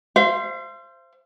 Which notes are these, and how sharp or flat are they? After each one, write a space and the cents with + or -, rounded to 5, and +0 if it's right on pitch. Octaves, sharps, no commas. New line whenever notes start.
C5 +0 F5 -45